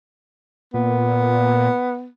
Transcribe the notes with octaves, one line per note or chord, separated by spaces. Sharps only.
A#2 B3